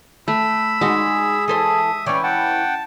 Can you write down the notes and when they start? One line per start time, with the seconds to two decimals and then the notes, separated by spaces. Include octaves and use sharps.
0.28 A3 B5 E6
0.81 G#3 D#4 F#4 G#4
1.48 E3 A4 C5 E5 D#6
2.06 E3 C#4 C#5 D5 G5
2.23 F#5 G5 A5